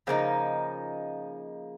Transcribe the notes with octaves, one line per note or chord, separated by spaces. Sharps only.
C#3 F3 A#3 D#4